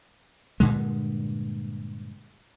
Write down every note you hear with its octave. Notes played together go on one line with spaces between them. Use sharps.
G2 A#2 D3 G#3